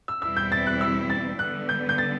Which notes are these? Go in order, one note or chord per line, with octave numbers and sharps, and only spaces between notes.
E6
E2 B2 G3 C4 E4 E6
G6
A6
F#6
E6
A6
D3 G3 B3 F#6
G6
G6
A6